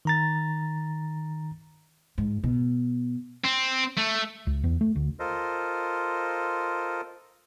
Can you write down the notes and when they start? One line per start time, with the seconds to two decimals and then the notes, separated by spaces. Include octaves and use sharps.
0.05 D#3 A#5 A6
2.18 G#2
2.44 B2
3.44 C4
3.98 A3
4.47 C#2
4.64 E2
4.81 A3
4.96 D2
5.19 F4 A4 A#4 C5 D#5